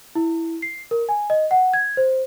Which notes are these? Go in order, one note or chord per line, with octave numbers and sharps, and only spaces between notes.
E4
C7
A#4
G#5
D#5
F#5
G#6
C5